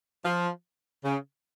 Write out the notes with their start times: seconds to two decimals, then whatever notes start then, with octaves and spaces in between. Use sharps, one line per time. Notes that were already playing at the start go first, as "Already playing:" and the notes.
0.25 F3
1.05 C#3